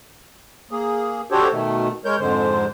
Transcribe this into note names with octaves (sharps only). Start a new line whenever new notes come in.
A#3 G#4
D4 F#4 G4 A4 C5 C#5
B2 D#3 A3
G#3 A#4 C#5 G6
F2 G#2 D3 G#3 C5